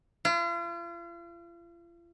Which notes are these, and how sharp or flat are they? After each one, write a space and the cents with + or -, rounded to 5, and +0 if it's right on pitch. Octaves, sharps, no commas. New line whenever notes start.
F4 -40